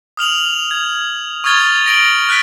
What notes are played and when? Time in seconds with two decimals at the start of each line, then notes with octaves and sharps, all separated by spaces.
0.17 D#6 F6 F7 F#7
0.71 G#6
1.44 C#6 D#6 F6 G#6 A6 G7
1.86 A#6 D7 F#7 G7
2.29 F6 F#6 A6 B6 D7